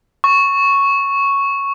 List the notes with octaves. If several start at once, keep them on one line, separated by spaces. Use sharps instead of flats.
C#6